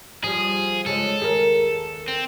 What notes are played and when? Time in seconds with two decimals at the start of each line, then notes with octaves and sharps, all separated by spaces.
0.24 F3 G3 G#4
0.86 C#3 F3 G#3 A4
1.20 D#2 G#4 A#4
2.08 C4